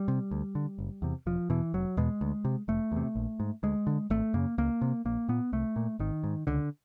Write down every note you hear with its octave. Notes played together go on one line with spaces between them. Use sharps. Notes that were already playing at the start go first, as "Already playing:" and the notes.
Already playing: G3
C3
D2
D3
F#1
E2 C3
E1 F3
E2 B2 E3
F1 F#3
E2 B2 G#3
D2
C3
F1 A3
E2 C3
A#1
G#2
D2 G#3
D3
G#1 A3
F#2 C#3 A#3
C#2 A#3
C3
A#1 A#3
A#2 B3
C2 A3
A#2
G#1 D#3
G#2
C#2 D3